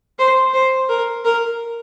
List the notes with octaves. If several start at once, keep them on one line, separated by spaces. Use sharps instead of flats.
C5
C5
A#4
A#4